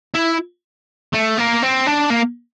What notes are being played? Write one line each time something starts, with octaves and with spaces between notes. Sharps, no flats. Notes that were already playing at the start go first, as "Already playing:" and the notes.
E4
A3
A#3
C4
D4
A#3